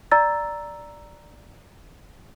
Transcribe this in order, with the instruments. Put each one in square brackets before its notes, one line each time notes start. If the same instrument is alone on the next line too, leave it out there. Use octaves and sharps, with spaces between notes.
[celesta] D5 A#5 E6 A6